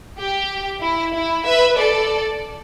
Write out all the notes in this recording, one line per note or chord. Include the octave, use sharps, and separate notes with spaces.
G4
E4
E4
B4 E5
A4 D5